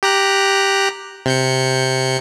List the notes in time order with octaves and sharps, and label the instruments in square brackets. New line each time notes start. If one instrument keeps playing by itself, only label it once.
[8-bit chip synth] G4 A#5 F#6
C3 G6 C#7